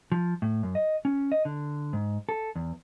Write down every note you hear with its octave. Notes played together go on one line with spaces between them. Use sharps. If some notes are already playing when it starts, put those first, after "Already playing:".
F3
A2
F#2
D#5
C#4
D#5
D3
G#2
A4
E2